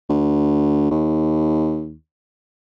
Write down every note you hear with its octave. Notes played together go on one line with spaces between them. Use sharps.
D2
D#2